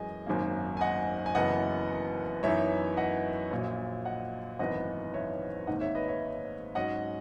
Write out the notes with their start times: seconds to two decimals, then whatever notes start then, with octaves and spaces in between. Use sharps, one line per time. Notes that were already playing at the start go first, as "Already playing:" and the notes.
Already playing: F#2 E3 G#3 D#5 G#5
0.26 G#1 F#2 D#3 A#3
0.77 G#5
0.81 D#5 F#5
1.26 G#5
1.35 F#1 F#2 E3 B3 D#5 F#5
2.43 F#2 E3 B3 D#4 C#5 E5
2.97 D#5 F#5
3.51 A#1 A#2 F#3
4.05 D#5 F#5
4.59 G#1 F#2 E3 B3 D#4 D#5 F#5
5.14 C#5 E5
5.67 G#1 G#2 D#3 A#3 D#5 F#5
5.81 C#5 E5
5.95 B4 D#5
6.08 C#5 E5
6.75 G#2 F#3 C#4 D#5 F#5